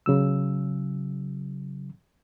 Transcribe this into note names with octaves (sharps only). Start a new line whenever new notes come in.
C#3 F#3 E6